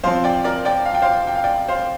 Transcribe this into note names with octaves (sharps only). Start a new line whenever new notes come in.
F3 C4 C5 F5
D5 G5
A#4 D5
D5 G5
F5
G5
C5 F5
G5
F5
D5 G5
C5 F5